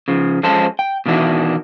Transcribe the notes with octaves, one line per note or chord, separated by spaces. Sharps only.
C#3 F3
F3 G#3 C#4 A4 C5 A5
G5
B2 D#3 E3 D4 E4 F#4